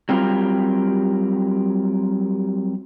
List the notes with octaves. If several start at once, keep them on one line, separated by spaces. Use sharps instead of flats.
F#3 G3 C4 F4 G4 A#4